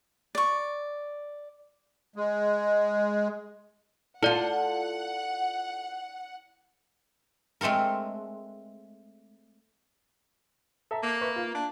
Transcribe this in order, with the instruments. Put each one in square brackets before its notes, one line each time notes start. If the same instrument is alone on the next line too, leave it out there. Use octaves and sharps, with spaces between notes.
[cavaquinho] D5 C#6
[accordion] G#3
[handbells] E4 D5 [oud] F4 A4 [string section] F#5
[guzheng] G#3 A3 C4 A4 A#4
[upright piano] A4 E5 A#5
[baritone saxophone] A#3
[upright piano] B4 E5 C#6
F4
[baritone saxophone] D4